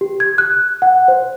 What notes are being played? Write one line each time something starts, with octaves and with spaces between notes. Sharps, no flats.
G4
G#6
F#6
F#5
C5